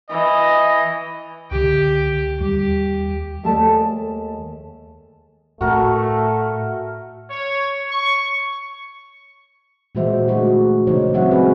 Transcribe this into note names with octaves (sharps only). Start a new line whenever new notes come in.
E3 D#5
C#2 D3 G4 G5
D#2 G3 G4
D#2 G#3 A3 A4 D5 A5
A2 A3 F#4 A#4 A5
C#5
C#6
A#2 E3 G#3 F#4 C5 E5
D3 G#3 A3 E4 F#4
C#3 E3 D#4 C5 C#5
F#3 C4 F#4 E5 F#5
G#3 C4 G#4 B4